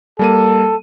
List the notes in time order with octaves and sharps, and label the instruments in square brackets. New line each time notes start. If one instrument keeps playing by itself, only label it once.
[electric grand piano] G3 A#3 D#7 [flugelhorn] A4